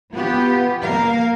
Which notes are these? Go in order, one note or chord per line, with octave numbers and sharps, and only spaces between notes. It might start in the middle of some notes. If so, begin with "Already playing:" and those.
B3 F4 G4
A#3 A#4 F5